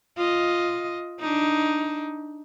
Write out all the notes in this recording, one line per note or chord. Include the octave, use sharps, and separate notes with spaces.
F4 D#5
D4 D#4